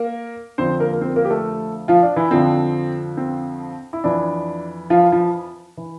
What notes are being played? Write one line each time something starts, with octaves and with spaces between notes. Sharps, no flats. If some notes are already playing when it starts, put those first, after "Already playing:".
Already playing: A#3 A#4
F2 D3 F3 C4 C5
A#3 A#4
A#4
C4 C5
A#3 A#4
G4
A3 A4
F3 F4
D4
E3 E4
F2 D3 F3 C4
C4
E4
F2 E3 D4
F3 F4
F3 F4
E3